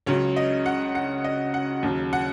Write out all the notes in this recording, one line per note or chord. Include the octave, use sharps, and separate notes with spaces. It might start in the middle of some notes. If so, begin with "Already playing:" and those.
C#2 C#3 F#3 C#5
D#5
F#5
F#5
D#5
F#5
D#2 C#3 F#3
F#5